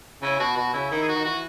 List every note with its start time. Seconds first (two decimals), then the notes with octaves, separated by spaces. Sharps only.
0.22 C#3 E4
0.39 B2 F#4
0.57 B2 F#4
0.73 C#3 E4
0.91 D#3 E4
1.02 G#4
1.08 F#4
1.15 D#3
1.25 E3 F#4